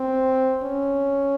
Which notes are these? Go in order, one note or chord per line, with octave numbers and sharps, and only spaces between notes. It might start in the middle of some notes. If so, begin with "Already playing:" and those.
Already playing: C4
C#4